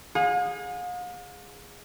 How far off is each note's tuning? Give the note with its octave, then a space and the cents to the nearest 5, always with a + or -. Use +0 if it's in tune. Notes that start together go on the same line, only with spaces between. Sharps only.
G#4 -15 F5 +45